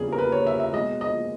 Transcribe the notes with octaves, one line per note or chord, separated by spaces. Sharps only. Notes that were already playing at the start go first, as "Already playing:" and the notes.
Already playing: E2 C#3 G3 G#4
A#4
B4
C#5
E5
E5
B2 G#3 D#5
D#5